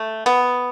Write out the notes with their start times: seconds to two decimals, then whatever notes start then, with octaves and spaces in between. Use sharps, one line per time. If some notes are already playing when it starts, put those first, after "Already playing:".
Already playing: A3
0.26 B3